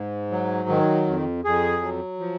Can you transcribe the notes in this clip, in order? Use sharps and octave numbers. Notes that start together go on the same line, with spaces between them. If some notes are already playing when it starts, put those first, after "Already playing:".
Already playing: G#2
F#3
D#3
F2
F2 G#4
F#3
F3